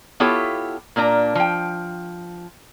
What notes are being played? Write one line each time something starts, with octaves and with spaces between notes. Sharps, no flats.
B3 E4 F4 G4 A4 C#5
A#2 A#3 D4 A#5
F3 G5